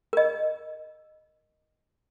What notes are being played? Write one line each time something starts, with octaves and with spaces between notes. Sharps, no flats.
A#4 D#5